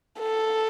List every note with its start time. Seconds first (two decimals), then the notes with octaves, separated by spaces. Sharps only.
0.19 A4